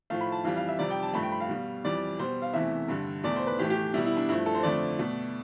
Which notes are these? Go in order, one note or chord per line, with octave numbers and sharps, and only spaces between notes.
A2 F3 A3 F5
B5
A5
F2 E3 G3 F5
F5
E5
F2 C3 G3 D5
G5
A5
G2 F3 A3 B5
G5
B5
F5
B2 G3
F2 E3 G3 D5
B2 G3 C5
F5
E2 C3 E3 A3 E5
G2 D3 G3
E2 B2 A3 D5
C5
B4
A2 E3 A3 G4
G4
B2 G3 E4
E4
D4
G2 F3 A3 E4
A4
C5
F2 D3 F3 A3 D5
B2 A3